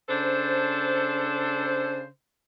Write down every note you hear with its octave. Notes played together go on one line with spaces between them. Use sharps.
C#3 D4 A4 C5